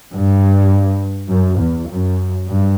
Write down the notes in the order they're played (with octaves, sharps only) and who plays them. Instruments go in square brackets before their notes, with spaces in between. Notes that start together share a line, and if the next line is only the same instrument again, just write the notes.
[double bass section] G2
F#2
E2
F#2
G2